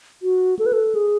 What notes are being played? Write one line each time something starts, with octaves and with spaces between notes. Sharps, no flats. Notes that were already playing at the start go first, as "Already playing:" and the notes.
F#4
A4
B4
A4
G#4